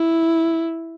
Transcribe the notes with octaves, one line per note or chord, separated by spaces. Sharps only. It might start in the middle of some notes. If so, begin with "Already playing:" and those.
Already playing: E4